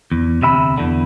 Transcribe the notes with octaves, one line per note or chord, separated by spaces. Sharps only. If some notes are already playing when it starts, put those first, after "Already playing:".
E2
D2 C3 E5 B5
E2 D3